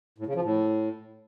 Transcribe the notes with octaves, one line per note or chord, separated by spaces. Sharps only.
A2
C#3
F3
A2